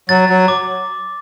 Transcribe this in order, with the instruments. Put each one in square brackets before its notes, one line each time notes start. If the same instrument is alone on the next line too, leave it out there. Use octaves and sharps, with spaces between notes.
[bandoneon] F#3 [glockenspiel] A6
[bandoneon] F#3
[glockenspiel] D6